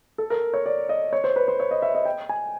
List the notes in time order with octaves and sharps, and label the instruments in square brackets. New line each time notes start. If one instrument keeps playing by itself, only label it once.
[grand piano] A4
A#4
C#5
D5
D#5
C#5
C5
B4
C5
C#5
D#5
E5
D#5
G5
G#5